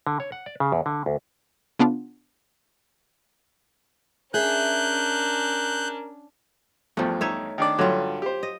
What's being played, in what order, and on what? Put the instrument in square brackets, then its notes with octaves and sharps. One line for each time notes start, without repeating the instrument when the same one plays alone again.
[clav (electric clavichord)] D3
C#5
F#5
D5
C#3
E2
D3
D2
[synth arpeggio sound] C#3 B3 D4 F4
[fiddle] C#4 D4 [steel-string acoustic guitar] G#4 E5 [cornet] A#4 [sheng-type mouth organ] F#6 G6
[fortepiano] E2 G2 [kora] F3 A3
[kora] D#4 C#5 E5
[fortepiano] D#3 D4 D5
[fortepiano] G2 D3 [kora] F#3 F4
[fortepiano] G4 C5
[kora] D#5